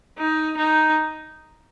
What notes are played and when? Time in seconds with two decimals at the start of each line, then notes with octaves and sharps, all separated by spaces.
0.18 D#4
0.57 D#4